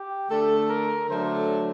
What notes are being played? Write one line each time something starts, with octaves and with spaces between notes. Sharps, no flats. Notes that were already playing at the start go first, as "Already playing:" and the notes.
Already playing: G4
D3 A3 D4 A4
A#4
D3 F#3 A3 D4 C5